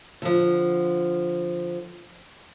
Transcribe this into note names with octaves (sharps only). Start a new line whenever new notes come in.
D3 F3